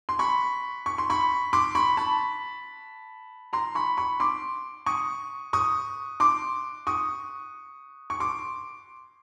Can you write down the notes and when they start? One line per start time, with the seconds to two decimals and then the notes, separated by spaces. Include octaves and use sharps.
0.09 C6
0.19 B5 C#6
0.86 C#6
0.98 C6
1.10 B5 C#6
1.53 C6 D6
1.75 B5 C#6
1.97 A5 B5
3.53 A#5 C6
3.75 B5 C#6
3.97 B5 C#6
4.20 C6 D6
4.86 C#6 D#6
5.53 C#6 D#6
6.20 C6 D6
6.87 C#6 D#6
8.10 C#6
8.20 C6 D6